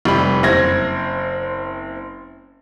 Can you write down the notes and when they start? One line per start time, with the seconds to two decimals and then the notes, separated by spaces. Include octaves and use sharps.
0.05 F1 G3 B5
0.43 F#1 C4 C5 G#6 A#6